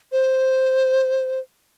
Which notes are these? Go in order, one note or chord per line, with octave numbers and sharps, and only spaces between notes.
C5